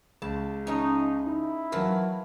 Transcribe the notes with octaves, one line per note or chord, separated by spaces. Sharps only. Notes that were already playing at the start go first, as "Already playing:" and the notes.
C#2 A5
A3 C#4 D#4
D#4 E4
E3 F#3 A3 F4 A#4